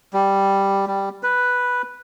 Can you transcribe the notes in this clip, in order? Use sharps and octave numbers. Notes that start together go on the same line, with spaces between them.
G3
G3
B4